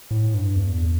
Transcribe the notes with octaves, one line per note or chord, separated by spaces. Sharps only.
A2
G2
E2